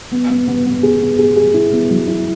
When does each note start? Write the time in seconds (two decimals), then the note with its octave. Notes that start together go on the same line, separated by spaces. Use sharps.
0.12 B3
0.30 B3
0.48 B3
0.66 B3
0.83 G#4
1.01 B3
1.18 G#4
1.36 G#4
1.54 E4
1.72 B3
1.90 F#3
2.08 E4